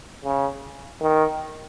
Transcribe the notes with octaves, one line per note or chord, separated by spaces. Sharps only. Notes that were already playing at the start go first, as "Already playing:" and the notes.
C#3
D#3